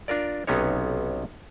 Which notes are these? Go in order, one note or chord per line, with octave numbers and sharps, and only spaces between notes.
D4 F4 A#4 D5
B1 C3 B3 C#4 D#4 C#5